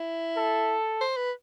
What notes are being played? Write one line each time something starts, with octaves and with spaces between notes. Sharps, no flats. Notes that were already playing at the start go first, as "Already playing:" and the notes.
Already playing: E4
A4
C5
B4